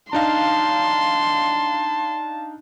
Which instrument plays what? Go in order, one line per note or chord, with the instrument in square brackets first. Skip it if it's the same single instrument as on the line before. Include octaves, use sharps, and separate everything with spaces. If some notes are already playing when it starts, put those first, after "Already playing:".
[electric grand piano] D4 D#4 F5 [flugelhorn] A5 [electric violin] C6